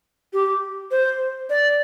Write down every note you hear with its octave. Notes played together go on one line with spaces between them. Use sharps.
G4
C5
D5